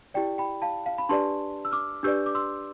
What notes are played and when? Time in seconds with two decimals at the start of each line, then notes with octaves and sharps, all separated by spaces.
0.14 E4 G4 D5 G5
0.38 G5 B5
0.62 F5 A5
0.86 F5
0.98 B5
1.09 D4 G4 B4 D5 A5 C6
1.65 E6
1.72 D6 F6
2.03 D4 G4 B4 D5 E6 G6
2.26 D6
2.35 C6 E6